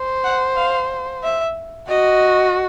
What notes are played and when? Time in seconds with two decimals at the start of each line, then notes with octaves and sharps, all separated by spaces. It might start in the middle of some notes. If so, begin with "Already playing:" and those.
Already playing: C5
0.24 F#5
0.57 F5
1.24 E5
1.89 F#4 D#5